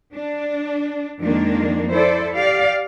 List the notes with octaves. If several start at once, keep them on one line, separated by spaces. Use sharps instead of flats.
D4
F2 D#3 G#3 A#3 D4
E4 A4 C5 D5
G4 D5 F5